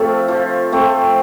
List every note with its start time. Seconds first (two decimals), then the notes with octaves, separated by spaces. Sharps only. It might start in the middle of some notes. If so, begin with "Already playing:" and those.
Already playing: F3 A3 C4 F4
0.28 F3
0.72 A3 C4